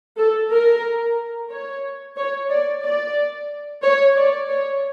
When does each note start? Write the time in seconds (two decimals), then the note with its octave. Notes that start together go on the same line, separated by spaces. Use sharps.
0.17 A4
0.50 A#4
1.51 C#5
2.16 C#5
2.50 D5
2.83 D5
3.83 C#5
4.16 D5
4.49 C#5